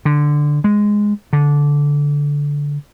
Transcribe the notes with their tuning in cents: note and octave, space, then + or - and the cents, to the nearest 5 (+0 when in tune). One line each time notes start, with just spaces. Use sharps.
D3 +5
G#3 -5
D3 -15